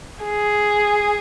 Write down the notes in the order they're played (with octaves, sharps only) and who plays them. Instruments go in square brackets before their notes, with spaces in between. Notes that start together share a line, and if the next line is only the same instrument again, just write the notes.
[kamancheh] G#4